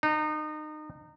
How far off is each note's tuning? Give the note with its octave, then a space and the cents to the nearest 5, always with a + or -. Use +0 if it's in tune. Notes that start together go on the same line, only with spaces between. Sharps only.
D#4 -30